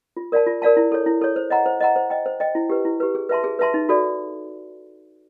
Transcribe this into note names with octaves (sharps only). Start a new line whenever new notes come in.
F4
A#4 D5 F5 A5
F4
A#4 D5 F5 A5
E4
A4 C#5
E4
A4 C#5
C5
D#5 F#5 A#5
C5
D#5 F#5 A#5
C5
D#5 G5
C5
D#5 G5
E4
G4 B4
E4
G4 B4
G#4
B4 E5 A5 C6
G#4
B4 E5 A5 C6
D#4
F#4 A4 D5